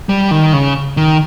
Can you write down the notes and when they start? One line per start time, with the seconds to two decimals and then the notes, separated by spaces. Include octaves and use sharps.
0.09 G3
0.31 D#3
0.53 C#3
0.97 D#3